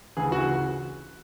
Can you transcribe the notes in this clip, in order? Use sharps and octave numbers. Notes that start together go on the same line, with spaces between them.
D2 C#3 E3 G#4
F#4